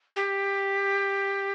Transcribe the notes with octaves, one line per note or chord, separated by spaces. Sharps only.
G4